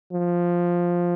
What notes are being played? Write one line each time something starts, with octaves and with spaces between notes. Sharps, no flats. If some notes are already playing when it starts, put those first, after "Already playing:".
F3